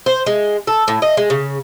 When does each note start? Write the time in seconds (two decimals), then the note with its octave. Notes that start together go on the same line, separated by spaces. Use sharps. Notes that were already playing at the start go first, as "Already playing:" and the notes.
0.06 C5
0.26 G#3
0.67 A4
0.88 A2
1.02 D#5
1.17 G#3
1.30 C#3